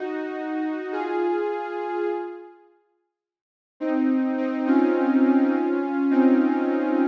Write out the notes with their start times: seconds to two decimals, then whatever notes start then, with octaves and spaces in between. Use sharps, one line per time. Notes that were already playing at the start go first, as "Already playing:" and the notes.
Already playing: D#4 F#4
0.92 F4 G#4
3.80 C4 D#4
4.38 C4 D#4
4.66 C#4 F4
6.11 C4 D#4